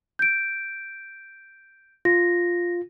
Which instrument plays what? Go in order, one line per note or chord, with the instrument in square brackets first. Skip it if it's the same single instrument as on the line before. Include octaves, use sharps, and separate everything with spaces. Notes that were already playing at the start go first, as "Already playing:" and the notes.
[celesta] G6 D7
[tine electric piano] F4 [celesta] A#6